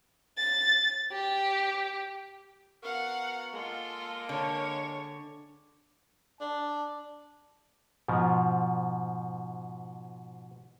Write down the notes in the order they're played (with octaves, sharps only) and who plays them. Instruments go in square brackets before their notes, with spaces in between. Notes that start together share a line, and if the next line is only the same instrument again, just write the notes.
[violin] A6
G4
[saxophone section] B3 F#4 A#4 [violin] F5 F#5
[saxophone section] G#3 A#3 [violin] F4 A4
[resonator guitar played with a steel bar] D3 [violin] C#5
[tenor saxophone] D4 [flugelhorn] A5
[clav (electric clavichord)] G#2 B2 F3